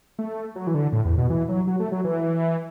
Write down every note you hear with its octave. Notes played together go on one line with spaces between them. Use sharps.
A3
F#3
E3
D3
A2
E2
B2
E3
F#3
F#3
A3
F#3
E3